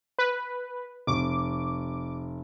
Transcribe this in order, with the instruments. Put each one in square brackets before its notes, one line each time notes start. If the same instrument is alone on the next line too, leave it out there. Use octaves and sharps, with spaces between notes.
[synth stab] B4
[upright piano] F1 C#6 [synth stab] D6